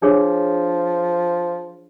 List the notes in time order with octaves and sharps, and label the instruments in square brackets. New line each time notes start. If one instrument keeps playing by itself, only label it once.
[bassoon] F3 [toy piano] D4 G#4 C#5